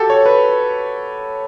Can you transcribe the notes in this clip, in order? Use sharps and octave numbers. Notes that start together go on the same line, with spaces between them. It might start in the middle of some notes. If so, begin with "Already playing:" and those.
Already playing: F#4 G4 A4
C#5
B4